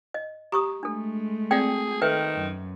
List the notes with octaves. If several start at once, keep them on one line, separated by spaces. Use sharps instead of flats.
D#5
G4 A#5 C#6 D#6
G#3 A3 D4 A4
C4 G#4 D5 G5
D#3 A4 B4 E5 G5
F#2